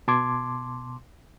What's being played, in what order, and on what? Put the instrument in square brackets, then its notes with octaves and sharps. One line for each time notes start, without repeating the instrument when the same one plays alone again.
[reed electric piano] B2 A5 C6 D6 G#6